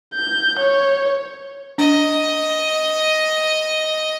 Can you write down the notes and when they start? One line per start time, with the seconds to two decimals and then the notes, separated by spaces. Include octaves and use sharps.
0.14 G6
0.59 C#5
1.78 D4 D#5